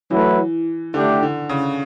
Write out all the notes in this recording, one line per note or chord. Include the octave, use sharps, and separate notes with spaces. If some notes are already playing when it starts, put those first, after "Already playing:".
E3 F#3 A3 E4 B4
D3 A3 D4 G4
D3
C#3